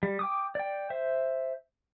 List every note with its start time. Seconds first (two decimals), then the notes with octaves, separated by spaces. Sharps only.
0.03 G3
0.19 G5 D6 D#6
0.55 D5 G5
0.90 C5 E5